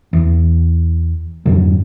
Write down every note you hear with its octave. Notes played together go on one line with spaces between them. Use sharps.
E2
F2 G#2 D3 F#3